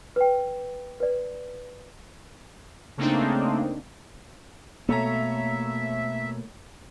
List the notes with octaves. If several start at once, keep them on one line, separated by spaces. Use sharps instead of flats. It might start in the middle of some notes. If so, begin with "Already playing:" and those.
B4 G5
B4 D5
C#3 A3 A#3 C4 D4 D#4
B2 A3 A#3 A4 C#5 E5 A#5